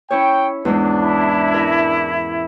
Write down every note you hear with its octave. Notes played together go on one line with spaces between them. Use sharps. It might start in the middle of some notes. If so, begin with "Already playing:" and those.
C#4 E4 C#5 G5
E2 G#2 G#3 D4
E4
A#4 E5 G#5